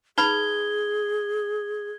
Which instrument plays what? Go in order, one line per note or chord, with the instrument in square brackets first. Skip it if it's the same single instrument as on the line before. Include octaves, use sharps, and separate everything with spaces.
[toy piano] D#4 B4 B5 [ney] G#4 [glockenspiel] G#6 G7